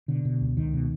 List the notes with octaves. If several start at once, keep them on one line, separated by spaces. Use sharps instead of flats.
B2 D3
B2
C#2
C#2 D#3
B2